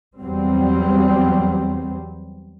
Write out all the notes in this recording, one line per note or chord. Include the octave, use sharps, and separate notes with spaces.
E2 F#3 G3 C4